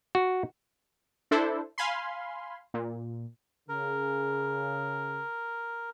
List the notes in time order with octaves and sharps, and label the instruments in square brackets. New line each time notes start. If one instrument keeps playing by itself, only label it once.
[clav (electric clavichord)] F#4
[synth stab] D4 E4 A4 C5
F5 G#5 B5 C6
A#2
[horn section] C#3 [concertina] A#4